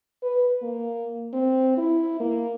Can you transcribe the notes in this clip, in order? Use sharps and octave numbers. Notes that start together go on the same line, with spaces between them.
B4
A#3
C4
E4
A#3